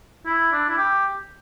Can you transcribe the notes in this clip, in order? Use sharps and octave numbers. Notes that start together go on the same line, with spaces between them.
E4
D4
E4
G4